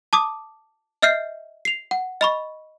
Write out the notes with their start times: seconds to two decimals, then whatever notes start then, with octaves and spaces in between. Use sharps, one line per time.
0.13 A5 D6 D#6
1.02 D#5 E5 F6 G6 C7
1.65 C7 F7
1.91 F#5
2.21 D#5 B5 C#6